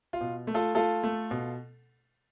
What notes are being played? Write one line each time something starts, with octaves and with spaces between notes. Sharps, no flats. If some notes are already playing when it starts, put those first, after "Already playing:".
F4
B2
A3
F4 A4
A3 F4 A4
A3
B2